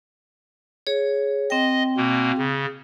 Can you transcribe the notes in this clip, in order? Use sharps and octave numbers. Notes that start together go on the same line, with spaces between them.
G#4 C#5
C4 D#5 G5
B2 A#3
C#3